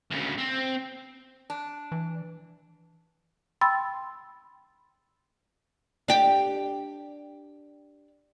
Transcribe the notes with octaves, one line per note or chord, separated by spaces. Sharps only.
D2 C#3
C4
D4
E3
G5 B5 C6 E6 A6
D4 G4